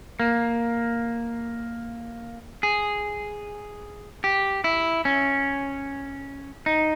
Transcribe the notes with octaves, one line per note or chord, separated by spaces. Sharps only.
A#3
G#4
G4
E4
C#4
D#4